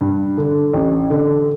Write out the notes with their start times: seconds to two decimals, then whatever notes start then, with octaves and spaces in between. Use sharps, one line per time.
0.01 G2
0.38 D3
0.73 A1
1.10 D3